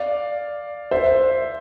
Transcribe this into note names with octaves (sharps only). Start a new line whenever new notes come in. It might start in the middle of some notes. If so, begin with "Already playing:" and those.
Already playing: D5 F5
C5 E5